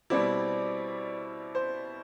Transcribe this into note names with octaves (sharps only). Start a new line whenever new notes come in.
B2 G3 C4 E4 D5
C5